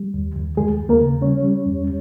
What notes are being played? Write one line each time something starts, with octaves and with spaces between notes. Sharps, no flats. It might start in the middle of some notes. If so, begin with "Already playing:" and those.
Already playing: G3
D#2
D#2
D#2 G#3 G#4
D#2
A#3 A#4
C#3
G3 C#4 C#5
G3
E2